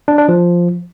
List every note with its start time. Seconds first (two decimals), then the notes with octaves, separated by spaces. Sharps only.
0.08 D4
0.18 D4
0.28 F3